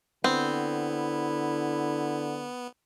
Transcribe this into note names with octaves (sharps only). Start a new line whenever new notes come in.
D3 B3 C4 E4